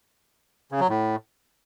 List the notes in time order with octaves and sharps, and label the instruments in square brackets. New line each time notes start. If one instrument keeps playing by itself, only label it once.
[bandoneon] C#3
F#3
A2